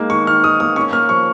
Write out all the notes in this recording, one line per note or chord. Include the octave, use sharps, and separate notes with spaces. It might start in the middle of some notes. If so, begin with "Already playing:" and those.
Already playing: G#3 A#3 D#4
D#3 C#6
D#3 F6
D#4 D#6
A#3 D#6
C#4 C#6
A#3 F6
F3 C#6